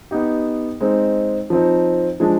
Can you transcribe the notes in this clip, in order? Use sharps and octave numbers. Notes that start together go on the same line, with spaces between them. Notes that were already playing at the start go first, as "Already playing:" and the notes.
B3 D#4 G4
G#3 C4 D#4
F3 C4 D#4
F3 G#3 D4